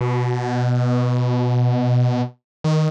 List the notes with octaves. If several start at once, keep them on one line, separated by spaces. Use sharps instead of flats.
B2
D#3